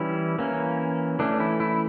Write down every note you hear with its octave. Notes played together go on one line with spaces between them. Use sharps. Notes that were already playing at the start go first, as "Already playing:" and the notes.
Already playing: E3 G3 C#4 E4
E3 A#3 C#4
E3 A3 C#4 D4
E4
E4